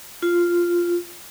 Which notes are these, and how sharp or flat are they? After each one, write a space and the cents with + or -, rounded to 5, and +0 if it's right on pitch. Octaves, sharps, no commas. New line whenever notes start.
F4 -5